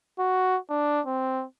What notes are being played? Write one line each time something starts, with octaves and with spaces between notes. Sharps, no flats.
F#4
D4
C4